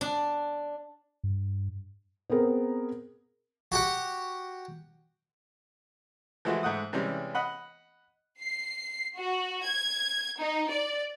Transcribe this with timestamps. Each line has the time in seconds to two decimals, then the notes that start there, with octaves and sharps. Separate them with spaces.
0.01 D4
1.24 G2
2.30 B3 C4 G#4 A#4
3.72 F#4 G4 F#5
6.45 E3 F3 G#3 A3 E4 F#4
6.63 G#2 A3 F#5 D#6
6.93 C3 E3 G3 G#3 C#4
7.35 D#5 F#5 B5
8.40 C7
9.16 F#4
9.65 G#6
10.40 D#4
10.70 D5